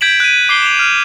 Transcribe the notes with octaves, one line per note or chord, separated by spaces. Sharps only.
G6 G#6 B6 D7 E7 F#7
F#6 D#7
D6 C7 G7
E7 F7
F6